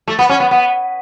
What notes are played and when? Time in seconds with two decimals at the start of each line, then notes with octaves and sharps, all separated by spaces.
0.08 A3
0.19 B3
0.29 C#4
0.40 B3
0.51 B3